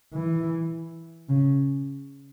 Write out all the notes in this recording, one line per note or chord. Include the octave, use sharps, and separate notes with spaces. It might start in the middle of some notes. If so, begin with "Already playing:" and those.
E3
C#3